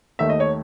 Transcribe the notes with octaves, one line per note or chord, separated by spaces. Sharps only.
D#2 D#3 A3 E5
D#5
C#5